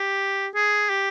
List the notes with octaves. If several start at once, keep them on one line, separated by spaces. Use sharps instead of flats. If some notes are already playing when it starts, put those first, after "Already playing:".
Already playing: G4
G#4
G4